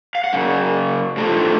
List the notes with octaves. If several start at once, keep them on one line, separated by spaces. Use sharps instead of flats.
F5
F#5
F#2 C#3
A2 F3 A3 D4